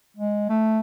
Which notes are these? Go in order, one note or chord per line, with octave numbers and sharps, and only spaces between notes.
G#3
A3